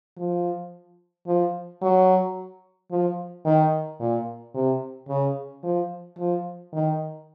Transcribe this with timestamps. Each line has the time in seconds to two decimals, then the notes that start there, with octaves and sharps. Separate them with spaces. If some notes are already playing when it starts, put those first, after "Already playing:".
0.18 F3
1.27 F3
1.82 F#3
2.91 F3
3.45 D#3
4.00 A#2
4.55 C3
5.09 C#3
5.63 F3
6.19 F3
6.73 D#3